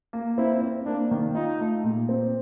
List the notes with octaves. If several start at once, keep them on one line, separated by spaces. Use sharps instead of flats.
A#3
C4 E4
C4
A#3 D4
D#3
D#4 F4
A3
A#2
C4